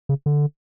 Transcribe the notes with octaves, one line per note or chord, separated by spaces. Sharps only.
C#3
D3